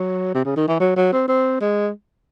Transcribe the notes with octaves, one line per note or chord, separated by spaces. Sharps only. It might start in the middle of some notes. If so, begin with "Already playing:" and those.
Already playing: F#3
C3
C#3
D#3
E3
F#3
F#3
C4
C4
G#3